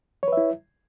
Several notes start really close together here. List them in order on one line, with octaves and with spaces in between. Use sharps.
C#5 B4 E5 E4